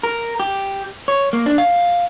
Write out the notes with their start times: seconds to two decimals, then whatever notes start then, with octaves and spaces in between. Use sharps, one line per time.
0.03 A#4
0.40 G4
1.08 C#5
1.33 A#3
1.46 D4
1.58 F5